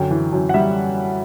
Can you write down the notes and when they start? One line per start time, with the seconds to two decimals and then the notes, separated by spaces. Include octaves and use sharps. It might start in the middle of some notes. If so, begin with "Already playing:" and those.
Already playing: F#2 D3 G5
0.11 E3
0.32 F#2
0.49 F#5
0.54 G3 E5